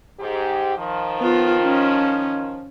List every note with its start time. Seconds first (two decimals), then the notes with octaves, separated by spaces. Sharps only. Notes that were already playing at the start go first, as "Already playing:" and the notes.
0.19 G#2 G4
0.77 D#3 F3
1.19 B3 F4
1.63 C#4